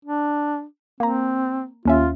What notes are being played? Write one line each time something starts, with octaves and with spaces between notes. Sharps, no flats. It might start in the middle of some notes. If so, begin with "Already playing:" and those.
D4
A#3 C4 A#5
D#2 C#4 F4 E5